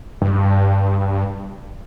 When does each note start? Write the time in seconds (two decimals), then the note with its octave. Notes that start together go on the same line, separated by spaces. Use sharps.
0.22 G2